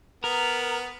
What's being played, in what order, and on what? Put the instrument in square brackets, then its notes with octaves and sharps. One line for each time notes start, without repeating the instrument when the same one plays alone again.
[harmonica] B3 [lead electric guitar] A#4